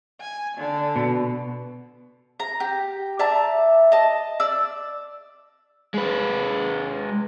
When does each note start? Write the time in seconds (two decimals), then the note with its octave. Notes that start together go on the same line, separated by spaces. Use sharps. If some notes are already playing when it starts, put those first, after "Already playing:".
0.21 G#5
0.58 D3
0.96 B2
2.40 A#5
2.60 G4
3.19 D5 E5 A5 A#5
3.92 D#5 A5
4.40 D5 E6
5.94 G#3 B4